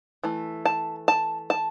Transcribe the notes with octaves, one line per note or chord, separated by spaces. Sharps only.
E3 A3
A5
A5
A5